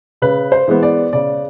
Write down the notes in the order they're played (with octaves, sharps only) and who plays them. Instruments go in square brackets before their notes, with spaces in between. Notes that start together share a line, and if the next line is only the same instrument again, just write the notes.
[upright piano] C#3 B4
C5
E3 G#3 B3
D5
C#3 D5